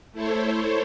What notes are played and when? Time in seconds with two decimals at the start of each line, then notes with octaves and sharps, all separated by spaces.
0.12 A3 E4 A4 C5 C#5